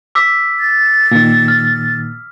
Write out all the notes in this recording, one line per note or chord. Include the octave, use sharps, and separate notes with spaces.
D6 E6 B6
A6
A#2 D#3
F6